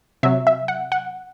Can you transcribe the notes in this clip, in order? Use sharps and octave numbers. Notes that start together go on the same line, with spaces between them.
C3 F#3 E5
E5
F#5
F#5